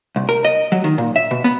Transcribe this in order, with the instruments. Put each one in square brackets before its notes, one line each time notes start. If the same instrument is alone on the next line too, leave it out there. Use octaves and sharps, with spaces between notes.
[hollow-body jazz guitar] C2
A#4
D#5
F#3
D#3
A#2
E5
B2
B3